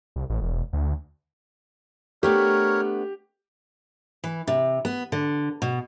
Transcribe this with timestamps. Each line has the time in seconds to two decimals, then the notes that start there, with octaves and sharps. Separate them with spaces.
0.16 C2
0.30 A1
0.42 E1
0.73 D2
2.23 A3 B3 D4 G4 A#4 C#5
4.24 E3
4.47 C3
4.85 B3
5.12 D3
5.62 B2